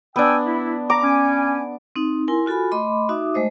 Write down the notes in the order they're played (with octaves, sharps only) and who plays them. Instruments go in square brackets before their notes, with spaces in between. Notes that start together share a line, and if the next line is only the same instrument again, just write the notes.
[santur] B3 D4 [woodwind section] G5 G#5 E6
[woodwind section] E4
[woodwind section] A#5 [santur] D6
[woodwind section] C#4 G#5
[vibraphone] C4 D#4
E4 A#4 G#5 C6
F4 F#4 A4 G#5 B5
A3 D#5 B5 C6 D6
D#4 F#4 E5 D6 D#6
G#3 A3 C5 D#5